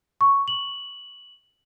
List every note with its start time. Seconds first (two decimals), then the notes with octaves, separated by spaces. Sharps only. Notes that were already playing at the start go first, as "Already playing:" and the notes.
0.21 C#6
0.48 F#7